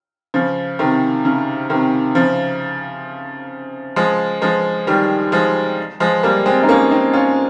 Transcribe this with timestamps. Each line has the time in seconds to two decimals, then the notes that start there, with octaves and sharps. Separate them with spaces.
0.34 C#3 F3
0.79 C3 D#3
1.25 C#3
1.70 C3 D#3
2.15 C#3 F3
3.96 F3 G#3
4.42 F3 G#3
4.87 D#3 G3
5.32 F3 G#3
6.00 F3 G#3
6.23 G3 A#3
6.46 G#3 C4
6.63 D#4
6.68 A#3 C#4
6.91 C4 D#4
7.13 C#4 F4